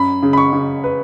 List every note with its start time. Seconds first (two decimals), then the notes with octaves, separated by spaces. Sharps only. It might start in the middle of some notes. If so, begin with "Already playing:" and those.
Already playing: F#2 B5
0.23 C#3
0.33 B5
0.37 C#6
0.53 C#3
0.84 B4